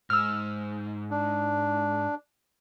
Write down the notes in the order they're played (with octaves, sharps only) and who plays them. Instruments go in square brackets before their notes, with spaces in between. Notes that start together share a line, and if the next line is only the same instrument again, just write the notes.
[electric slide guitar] G#2 [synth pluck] E6 F6
[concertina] D4